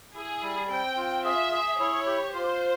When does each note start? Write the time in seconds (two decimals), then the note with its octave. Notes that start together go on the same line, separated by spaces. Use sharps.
0.14 E4 G#4
0.41 G3
0.69 C4 G5
0.97 F4
1.24 G#4 E5
1.52 G#4
1.79 E4 C#5
2.06 G4
2.34 F4 C5